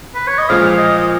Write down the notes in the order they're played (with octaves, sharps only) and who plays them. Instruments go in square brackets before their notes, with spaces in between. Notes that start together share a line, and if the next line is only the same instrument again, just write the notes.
[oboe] B4
C#5
D#5
[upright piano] A#2 F3 G#3 [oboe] F5
[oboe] D#5
D#5